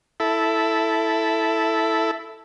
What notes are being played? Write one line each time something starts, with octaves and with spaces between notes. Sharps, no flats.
E4 A4